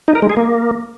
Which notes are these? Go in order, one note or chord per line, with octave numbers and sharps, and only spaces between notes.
D#4
A#4
G#3
G#4
A#3